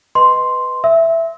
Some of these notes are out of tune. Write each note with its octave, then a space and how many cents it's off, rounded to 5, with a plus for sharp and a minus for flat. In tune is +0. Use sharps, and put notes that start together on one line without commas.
B4 +5 D#5 +0 C6 +0
E5 +5 E6 -30